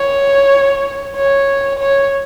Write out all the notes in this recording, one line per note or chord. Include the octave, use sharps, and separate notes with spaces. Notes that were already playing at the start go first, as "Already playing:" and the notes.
Already playing: C#5
C#5
C#5